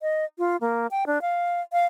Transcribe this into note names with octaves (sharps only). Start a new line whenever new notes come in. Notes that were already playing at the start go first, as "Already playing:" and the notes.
D#5
F4
A#3
G5
D4
F5
F5